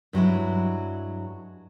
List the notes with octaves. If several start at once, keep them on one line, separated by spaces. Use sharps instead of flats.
G2 F#3 G#3 E4